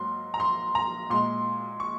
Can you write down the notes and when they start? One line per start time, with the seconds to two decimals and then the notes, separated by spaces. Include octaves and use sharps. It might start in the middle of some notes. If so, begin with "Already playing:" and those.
Already playing: G#2 F#3 A#3 C6
0.34 A#5
0.40 C6
0.75 A#5
1.10 A#2 G#3 C6
1.80 C#6